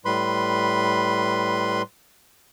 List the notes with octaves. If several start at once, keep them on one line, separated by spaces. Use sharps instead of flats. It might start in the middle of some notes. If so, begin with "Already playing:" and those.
A2 G3 B4 B5 C6